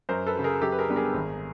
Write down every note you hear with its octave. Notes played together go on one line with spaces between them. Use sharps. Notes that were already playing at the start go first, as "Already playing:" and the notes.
F#2 A#4 C5
A4 B4
C#3 F#3
G#4 A#4
F#2 G4 A4
B4
G#4 A#4
D3 G3 B3
G#4 A#4
G#1